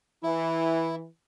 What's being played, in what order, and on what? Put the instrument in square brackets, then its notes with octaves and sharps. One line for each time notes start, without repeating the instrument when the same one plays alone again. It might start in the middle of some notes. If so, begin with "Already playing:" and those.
[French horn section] E3 [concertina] E4